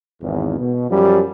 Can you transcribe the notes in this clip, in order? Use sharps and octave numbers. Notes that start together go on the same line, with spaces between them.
G#1 E2
B2
F#2 F3 G3